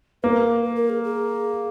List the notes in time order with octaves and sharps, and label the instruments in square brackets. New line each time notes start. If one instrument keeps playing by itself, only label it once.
[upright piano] A#3 [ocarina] B4
[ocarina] A#4
A#4
G#4
G#4